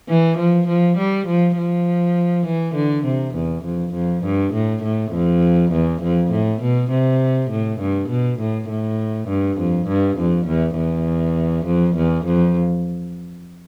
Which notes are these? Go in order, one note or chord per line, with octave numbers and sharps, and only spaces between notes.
E3
F3
F3
G3
F3
F3
E3
D3
C3
E2
F2
F2
G2
A2
A2
F2
E2
F2
A2
B2
C3
A2
G2
B2
A2
A2
G2
F2
G2
F2
E2
E2
F2
E2
F2